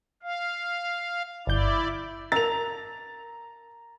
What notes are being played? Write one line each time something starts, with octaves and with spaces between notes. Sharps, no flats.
F5
G1 E4 D5 G6
A#4 A#5 E6 A6 F7